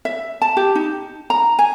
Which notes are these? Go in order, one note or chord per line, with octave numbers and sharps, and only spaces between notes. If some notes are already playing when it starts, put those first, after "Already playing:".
E5
A5
G4
D#4
A#5
G#5